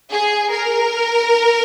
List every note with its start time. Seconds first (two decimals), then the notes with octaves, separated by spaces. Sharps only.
0.11 G#4
0.50 A#4